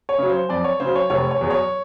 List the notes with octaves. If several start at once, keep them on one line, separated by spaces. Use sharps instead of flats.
C#5
C#3 F#3
C5
F2 D5
C#5
C#3 F#3 C5
C#5
F1 C#5
C#5
E2 B2 F#3
C#5